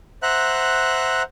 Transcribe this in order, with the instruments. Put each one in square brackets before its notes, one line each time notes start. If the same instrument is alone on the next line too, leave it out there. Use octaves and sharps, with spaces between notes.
[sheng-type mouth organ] C5 E5 F#5 A#5 F#6